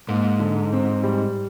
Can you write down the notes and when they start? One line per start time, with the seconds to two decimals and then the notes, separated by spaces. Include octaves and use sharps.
0.08 G#2 A#3
0.40 D3
0.73 C4
1.04 G3